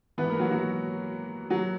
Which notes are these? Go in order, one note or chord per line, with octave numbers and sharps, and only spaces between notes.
G#2 E3 B3 B4
A#3 A#4
F#3 F#4
F#3 F#4
F#3 F#4